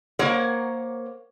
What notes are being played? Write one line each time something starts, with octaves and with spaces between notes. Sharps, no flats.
A#3 A#4 C5 C#5 F#5